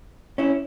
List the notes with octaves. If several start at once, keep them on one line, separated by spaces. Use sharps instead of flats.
C#4 E4